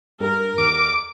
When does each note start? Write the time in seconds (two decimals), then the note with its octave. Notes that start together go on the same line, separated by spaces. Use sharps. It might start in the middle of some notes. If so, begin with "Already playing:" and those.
0.20 G2 A#4
0.58 D#2 D6